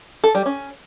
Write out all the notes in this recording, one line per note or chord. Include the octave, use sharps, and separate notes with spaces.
A4
G3
C#4